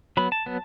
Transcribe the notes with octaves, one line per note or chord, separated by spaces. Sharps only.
F#3 B3 B5
A5
F#3 B3